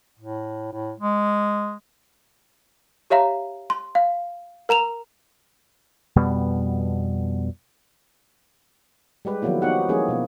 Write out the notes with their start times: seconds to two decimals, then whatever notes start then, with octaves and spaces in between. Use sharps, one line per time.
0.19 A2
0.73 A2
0.99 G#3
3.10 G4 C#5 E5 F5 A#5
3.70 C6
3.95 F5
4.69 A#4 A#5 E7 F7
6.16 F2 B2 G3 B3
9.25 G3 G#3 G4 B4
9.42 D#3 F3 F#3 A#3 B3 E4
9.62 B3 D#4 F#4 G4 B4 F#5
9.89 F3 G#3 A#3 C#4 E4 G#4
10.08 B2 A#3